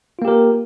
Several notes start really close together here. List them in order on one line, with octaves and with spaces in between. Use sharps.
F4 A#3 G4 A#4